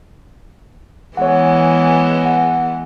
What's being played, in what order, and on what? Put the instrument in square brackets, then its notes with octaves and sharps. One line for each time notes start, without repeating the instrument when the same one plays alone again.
[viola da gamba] E3 G#3 B3 [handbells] C#5 F#5
[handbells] F#5